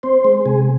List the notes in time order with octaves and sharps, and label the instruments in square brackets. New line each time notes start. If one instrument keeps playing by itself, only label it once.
[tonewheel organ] C4 C5
G#3
C3 G#4